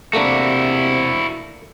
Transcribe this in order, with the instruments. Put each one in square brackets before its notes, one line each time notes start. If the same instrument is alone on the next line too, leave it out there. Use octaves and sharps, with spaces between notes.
[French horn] C3 [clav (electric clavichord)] A3 A#3 D4 [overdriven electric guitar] E4 F#4